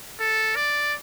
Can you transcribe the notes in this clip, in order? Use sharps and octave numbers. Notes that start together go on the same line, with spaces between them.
A4
D5